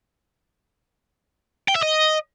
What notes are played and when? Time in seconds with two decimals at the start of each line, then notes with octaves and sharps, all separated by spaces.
1.68 G5
1.75 E5
1.83 D#5